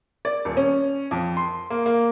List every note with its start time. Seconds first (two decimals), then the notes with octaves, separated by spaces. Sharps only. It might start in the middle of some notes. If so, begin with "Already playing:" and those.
0.25 D5
0.45 D#1
0.57 C#4
1.11 F2
1.37 C6
1.70 A#3
1.86 A#3